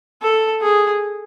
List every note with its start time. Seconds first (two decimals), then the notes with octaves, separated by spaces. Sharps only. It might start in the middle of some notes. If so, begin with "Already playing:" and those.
0.22 A4
0.62 G#4